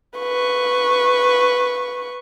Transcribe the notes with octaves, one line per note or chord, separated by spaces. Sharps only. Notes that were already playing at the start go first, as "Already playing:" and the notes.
B4 C#6